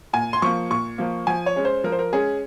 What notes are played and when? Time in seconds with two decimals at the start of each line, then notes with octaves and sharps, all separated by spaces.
0.13 A#2 G#5
0.33 C6
0.42 F3 A#3 C#6
0.70 A#2 C#6
0.98 F3 A#3
1.27 F3 G#5
1.46 C#5
1.56 G#3 C#4
1.65 C5
1.84 F3 A#4
1.92 C5
1.99 A#4
2.13 G#3 C#4 G#4